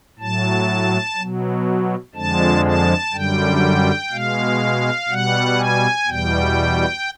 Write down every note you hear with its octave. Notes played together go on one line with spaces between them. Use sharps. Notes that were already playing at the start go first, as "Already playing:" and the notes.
A2 F#3 A5
B2 F#3
F2 D3 F3 G#3 A5
A5
F#2 D3 G3 G5
B2 G#3 F5
B2 G3 F#5
G#5
E2 B2 G3 G5